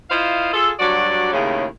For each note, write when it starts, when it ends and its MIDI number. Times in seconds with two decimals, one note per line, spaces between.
0.10 0.51 64
0.10 0.51 65
0.10 0.51 72
0.10 0.51 75
0.10 0.51 77
0.54 0.72 65
0.54 0.72 68
0.54 0.72 69
0.80 1.31 43
0.80 1.31 54
0.80 1.31 66
0.80 1.31 74
1.33 1.66 39
1.33 1.66 45
1.33 1.66 49